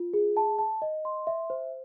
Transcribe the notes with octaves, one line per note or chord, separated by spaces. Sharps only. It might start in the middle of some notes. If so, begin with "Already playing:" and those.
Already playing: F4
G#4
A5
A5
D#5
C6
E5
C5